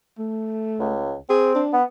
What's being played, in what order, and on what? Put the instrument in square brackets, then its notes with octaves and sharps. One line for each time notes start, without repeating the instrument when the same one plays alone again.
[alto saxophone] A3
[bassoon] C#2
[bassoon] C4 [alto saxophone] G#4
[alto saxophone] D4
[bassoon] B3